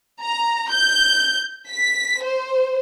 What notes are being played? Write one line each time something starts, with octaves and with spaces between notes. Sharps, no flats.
A#5
G6
B6
C5